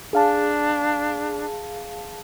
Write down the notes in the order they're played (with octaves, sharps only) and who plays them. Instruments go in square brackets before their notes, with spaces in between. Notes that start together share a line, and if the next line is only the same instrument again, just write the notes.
[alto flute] D4 [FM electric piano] G#4 F5 A5